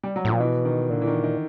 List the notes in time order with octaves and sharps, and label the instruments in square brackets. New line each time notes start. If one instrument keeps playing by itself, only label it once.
[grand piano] G3
F#3
[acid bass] A2
[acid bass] A#2 [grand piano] F3
[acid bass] B2 [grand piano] E3
[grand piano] D#3
[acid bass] A#2 [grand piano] D3
[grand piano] E3
D#3
D#3